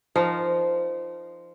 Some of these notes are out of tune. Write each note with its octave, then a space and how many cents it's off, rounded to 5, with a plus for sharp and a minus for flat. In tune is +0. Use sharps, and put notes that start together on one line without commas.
F3 -15 D#4 -20 A#4 +0